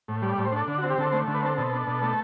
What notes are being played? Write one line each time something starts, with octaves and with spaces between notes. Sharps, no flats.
A2
G3 D5
D5
A2
C5
D4 A4
D3
F#4
C4
G4
D3 A4
A3 C5
D3
B4
C4 A4
B2 A4
D4
B2
A3